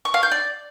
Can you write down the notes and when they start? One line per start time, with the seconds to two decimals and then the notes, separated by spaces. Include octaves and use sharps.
0.05 C#6
0.14 F5
0.23 G6
0.32 D5